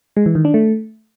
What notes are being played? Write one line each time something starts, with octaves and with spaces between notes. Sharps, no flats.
G#3
E3
D#3
D4
A3